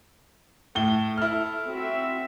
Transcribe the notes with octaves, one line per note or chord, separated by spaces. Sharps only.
A2 A3 G7
E4 A4 F6
C4 F#4 E5